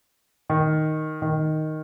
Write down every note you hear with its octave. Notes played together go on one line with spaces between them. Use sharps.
D#3
D#3